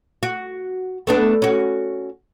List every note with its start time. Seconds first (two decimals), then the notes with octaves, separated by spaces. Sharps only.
0.23 F#4
1.07 A3 B3 D4
1.42 C#4 F#4